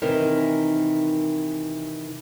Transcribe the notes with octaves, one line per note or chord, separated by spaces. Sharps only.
C3 D#3 E3 D#4 A#4